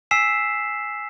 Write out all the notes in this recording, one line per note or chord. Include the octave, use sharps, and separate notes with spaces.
G#5 E6 B6 C7 E7